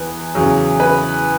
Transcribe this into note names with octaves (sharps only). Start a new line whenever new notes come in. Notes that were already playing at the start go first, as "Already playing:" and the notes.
Already playing: E2 B4
E2 C#3 F#3
B4